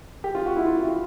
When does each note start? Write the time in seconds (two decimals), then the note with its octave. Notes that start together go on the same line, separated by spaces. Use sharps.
0.24 G4
0.35 F4
0.46 F#4
0.56 E4
0.67 F4
0.78 E4
0.89 F4